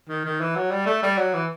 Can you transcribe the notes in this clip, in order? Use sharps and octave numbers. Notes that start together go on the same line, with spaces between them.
D#3
D#3
E3
F#3
G3
A3
G3
F#3
E3